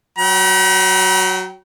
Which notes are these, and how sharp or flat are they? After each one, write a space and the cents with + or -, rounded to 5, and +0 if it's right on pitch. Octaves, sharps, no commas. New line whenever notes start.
F#3 +0 G5 -40 A#5 +45